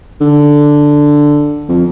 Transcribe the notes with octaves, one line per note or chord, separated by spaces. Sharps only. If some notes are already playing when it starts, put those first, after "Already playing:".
D3
F2